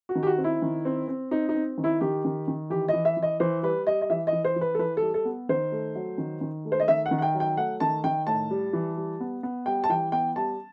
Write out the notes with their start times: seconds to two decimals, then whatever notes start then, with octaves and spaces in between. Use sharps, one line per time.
0.09 F#4
0.15 D#3
0.23 G4
0.27 F#4
0.38 C4
0.44 E4
0.62 D#3
0.85 C4
1.08 C4
1.31 C4 D#4
1.49 D#4
1.55 C4
1.78 D#3
1.84 E4
2.01 D#3 G4
2.25 D#3
2.48 D#3
2.70 E3 G4
2.88 E3 D#5
3.05 E5
3.17 E3
3.23 D#5
3.40 E3 C5
3.63 G3 B4
3.87 G3 D#5
4.01 D#5
4.10 E3 E5
4.27 D#5
4.33 E3
4.45 C5
4.56 E3
4.61 B4
4.75 A4
4.79 E3 B4
4.97 A4
5.02 G3
5.14 A4
5.25 B3
5.49 D#3 C5
5.72 A3
5.95 F#3
6.18 D#3
6.41 D#3
6.65 A3
6.72 C5
6.80 D#5
6.88 D#3 E5
7.06 F#5
7.11 D#3
7.18 F#5
7.22 G5
7.34 F#3
7.40 G5
7.57 A3 F#5
7.80 D#3 A5
8.04 D#3 G5
8.27 A2 A5
8.51 G3
8.73 E3
8.97 G3
9.20 B3
9.43 B3
9.66 G3 G5
9.84 A5
9.89 E3 G5
10.12 B3 G5
10.36 G3 A5